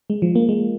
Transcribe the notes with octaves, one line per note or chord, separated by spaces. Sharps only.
G#3
F3
A#3
G#3